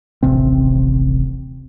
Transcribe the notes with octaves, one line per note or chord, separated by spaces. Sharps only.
D#1 A1 C3 C4